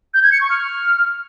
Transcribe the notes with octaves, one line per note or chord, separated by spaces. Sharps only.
G6
G#6
C#7
C#6
F6